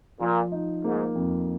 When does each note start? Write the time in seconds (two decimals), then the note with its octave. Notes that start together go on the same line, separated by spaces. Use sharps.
0.20 A#2 F3
0.52 D#4
0.84 G#2 A#3
1.16 F2